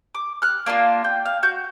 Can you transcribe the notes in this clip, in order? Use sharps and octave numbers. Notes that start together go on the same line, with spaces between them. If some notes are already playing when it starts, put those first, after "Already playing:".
D6
F6 F#6
A#3 D4 E4 F4
G5
F5
F#4 G6